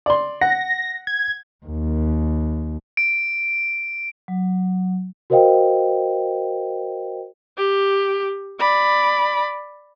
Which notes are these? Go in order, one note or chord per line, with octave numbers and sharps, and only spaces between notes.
D5 C6
F#5 A#6
G#6
D#2
D7
F#3
F#4 A#4 C5 D#5 F5 G5
G4
D5 B5